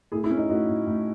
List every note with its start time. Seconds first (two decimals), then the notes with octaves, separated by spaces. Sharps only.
0.12 A2 E4 G#4
0.24 E4
0.31 C#4
0.37 D#4
0.49 A2 D#4 F#4
0.68 A2
0.87 A2